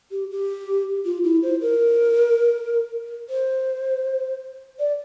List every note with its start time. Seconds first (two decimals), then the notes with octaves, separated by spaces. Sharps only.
0.11 G4
0.30 G4
1.05 F4
1.24 E4
1.42 C5
1.61 A#4
3.29 C5
4.79 D5